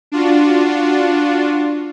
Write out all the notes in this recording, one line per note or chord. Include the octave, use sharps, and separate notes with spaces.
D4 F4 F#4